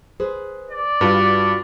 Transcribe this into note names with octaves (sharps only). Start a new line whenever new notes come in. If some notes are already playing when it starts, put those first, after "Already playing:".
G#4 B4 C5
D5
G2 F4 F#4 B4